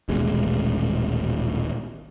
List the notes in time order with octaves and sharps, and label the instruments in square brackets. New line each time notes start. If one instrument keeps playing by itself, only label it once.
[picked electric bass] D#1 A1 B2 G#3